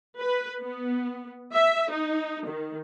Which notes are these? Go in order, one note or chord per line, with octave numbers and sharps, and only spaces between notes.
B4
B3
E5
D#4
D#3